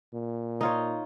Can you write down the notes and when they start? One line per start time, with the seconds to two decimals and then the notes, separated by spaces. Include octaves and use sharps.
0.14 A#2
0.61 D#4 F4 C#5